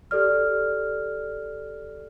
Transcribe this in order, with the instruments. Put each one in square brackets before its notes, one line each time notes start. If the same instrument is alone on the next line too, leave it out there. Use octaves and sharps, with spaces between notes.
[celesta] G4 A4 D5 F6